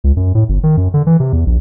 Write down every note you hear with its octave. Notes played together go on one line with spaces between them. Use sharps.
C#2
F#2
A2
G1
D#3
F#2
D3
E3
C3
E2
A#1